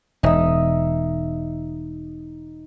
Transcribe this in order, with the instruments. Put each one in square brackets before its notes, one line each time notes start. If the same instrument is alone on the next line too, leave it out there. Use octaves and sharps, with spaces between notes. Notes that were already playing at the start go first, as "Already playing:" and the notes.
[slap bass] E1 [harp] D#4 E5 D#6